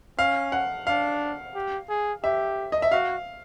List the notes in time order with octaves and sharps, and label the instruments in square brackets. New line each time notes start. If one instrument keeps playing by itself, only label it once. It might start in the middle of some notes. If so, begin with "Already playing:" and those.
[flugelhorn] C#4 [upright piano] F5
[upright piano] F#5
[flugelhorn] D4 [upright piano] F5
[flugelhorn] G4
G#4
[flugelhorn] G4 [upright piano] E5
[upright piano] D#5
E5
[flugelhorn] F#4 [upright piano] F5